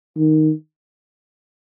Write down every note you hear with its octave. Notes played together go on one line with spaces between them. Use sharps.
D#3